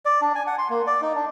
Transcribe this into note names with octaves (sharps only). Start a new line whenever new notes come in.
D5
D4
G#5
F#5
C6
A#3
D5
D#4
D4